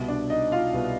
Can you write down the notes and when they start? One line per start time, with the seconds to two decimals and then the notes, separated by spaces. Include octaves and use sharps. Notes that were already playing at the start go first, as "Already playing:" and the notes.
Already playing: C2 B2 B3
0.08 D4 D5
0.30 D#4 D#5
0.52 F4 F5
0.74 C2 B2 B3